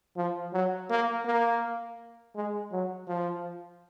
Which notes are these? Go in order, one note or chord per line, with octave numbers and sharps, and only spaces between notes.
F3
F#3
A#3
A#3
G#3
F#3
F3